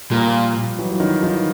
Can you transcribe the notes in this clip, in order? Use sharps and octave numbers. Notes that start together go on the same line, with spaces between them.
A#2 F3 G3
E3 F#3
F#3
D#3 F3
D#3 F3